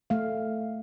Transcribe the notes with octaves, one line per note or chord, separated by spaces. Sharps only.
A3 F5